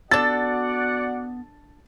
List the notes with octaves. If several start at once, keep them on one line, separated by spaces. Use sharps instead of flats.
B3 D4 F#4 A4 D5 F#5 A6